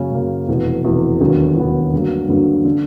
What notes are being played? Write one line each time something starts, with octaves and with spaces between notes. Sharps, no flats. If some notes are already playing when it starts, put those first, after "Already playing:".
Already playing: F#2 C#3 F#3 A#3 C#4
F#2 C#3 F#3 A#3 C#4
F1 E2 B2
F1 E2 B2
E1 D#2 D3 F#3 B3
E1 D#2 D3 F#3 B3
G2 D3 F#3 A#3
G2 D3 F#3 A#3
D3